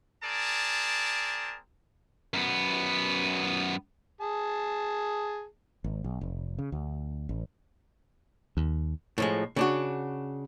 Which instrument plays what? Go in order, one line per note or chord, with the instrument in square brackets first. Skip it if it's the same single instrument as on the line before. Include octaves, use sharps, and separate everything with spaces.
[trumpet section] C4 G#4 A#4 D5 A5
[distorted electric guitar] F#2 B3
[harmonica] G#4 A5
[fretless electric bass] G#1
B1
F1
C#3
D2
A1
[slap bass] D#2
[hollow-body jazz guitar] A2 F3 G#3
C#3 D4 F#4